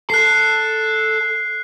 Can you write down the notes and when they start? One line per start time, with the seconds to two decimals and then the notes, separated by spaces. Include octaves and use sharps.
0.10 A4 F#6 C7